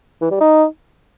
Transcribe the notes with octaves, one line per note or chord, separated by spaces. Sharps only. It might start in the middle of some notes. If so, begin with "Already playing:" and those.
E3
G3
D#4